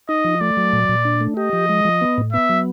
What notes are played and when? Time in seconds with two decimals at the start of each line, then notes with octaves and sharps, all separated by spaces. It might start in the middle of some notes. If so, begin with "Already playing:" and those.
0.09 D#4 D#5
0.25 F3
0.41 A3 D5
0.57 F#3
0.73 A#2
0.89 A#2
1.05 D4
1.21 A3
1.37 G4 D#5
1.53 F3
1.69 G#3
1.85 F3
2.01 B3
2.18 A2
2.33 B3 E5
2.49 F#3